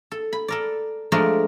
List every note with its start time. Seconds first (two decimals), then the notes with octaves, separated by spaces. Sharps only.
0.11 A4
0.33 B5
0.48 A4 A#4 D5
1.12 F3 G#3 A3 D4 A#4 D5